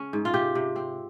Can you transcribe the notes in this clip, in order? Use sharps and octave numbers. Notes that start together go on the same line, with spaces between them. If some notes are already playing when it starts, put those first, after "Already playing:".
Already playing: C#3 C#4
G#2
F4
C3 G4
C3
C4